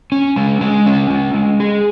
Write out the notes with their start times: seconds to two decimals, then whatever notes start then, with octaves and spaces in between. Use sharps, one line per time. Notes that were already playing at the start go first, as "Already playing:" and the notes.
0.12 C#4
0.36 G#3
0.61 G#3
0.86 C#4
1.10 G#3
1.34 G#3
1.60 G#4